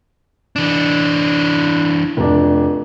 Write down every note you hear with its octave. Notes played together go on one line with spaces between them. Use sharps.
E3 D4
F1 D4